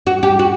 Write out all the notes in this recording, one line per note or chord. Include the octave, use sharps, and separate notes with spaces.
F#4
G4
F#4